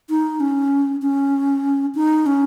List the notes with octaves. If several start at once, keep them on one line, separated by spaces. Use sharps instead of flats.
D#4
C#4
C#4
D#4
C#4